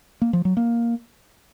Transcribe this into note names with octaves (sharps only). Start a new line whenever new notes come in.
A#3
F3
F#3
A#3